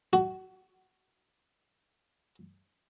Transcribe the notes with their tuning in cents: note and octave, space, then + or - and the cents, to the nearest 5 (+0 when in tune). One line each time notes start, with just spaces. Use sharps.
F#4 +20